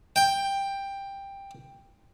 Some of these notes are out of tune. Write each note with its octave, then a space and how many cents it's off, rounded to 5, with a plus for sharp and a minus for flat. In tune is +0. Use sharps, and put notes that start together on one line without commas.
G5 +10